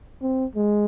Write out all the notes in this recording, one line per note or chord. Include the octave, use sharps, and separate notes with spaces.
C4
G#3